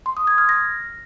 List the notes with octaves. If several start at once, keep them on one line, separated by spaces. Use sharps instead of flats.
C6
D#6
G#6
F6
A#6